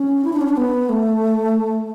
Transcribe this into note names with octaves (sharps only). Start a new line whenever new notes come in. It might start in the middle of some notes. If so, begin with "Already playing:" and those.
Already playing: C#4
E4
D4
C#4
D4
B3
A3